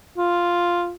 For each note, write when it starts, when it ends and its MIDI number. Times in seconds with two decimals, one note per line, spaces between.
0.17 0.93 65